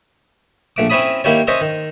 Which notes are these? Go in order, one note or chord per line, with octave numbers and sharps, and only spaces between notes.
A#1 A3 D6
C4 C#4 E4 C#5 B5 D#6
D#3 A#3 E4 G4 C#5
C#4 C5 C#5 D#5 E5 C6
D#3